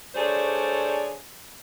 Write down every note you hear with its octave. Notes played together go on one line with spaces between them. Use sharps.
G3 A3 D4 G#4 C5 C#5